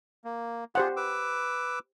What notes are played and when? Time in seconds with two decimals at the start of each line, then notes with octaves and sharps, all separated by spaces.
0.25 A#3
0.75 F4 G4 G#4 C5 F#5
0.97 B4 D6 E6